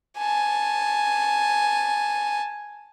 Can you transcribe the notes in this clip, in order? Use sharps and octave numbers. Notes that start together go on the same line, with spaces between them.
G#5 A5